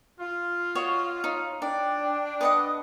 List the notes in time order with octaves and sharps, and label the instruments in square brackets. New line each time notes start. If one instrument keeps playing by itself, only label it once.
[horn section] F4
[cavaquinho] F#4 C#5 D#5
[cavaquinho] D#4 [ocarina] C#5
[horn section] D4 [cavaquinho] D5 [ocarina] G5
[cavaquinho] B4 D#5 F#5 [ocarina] D#6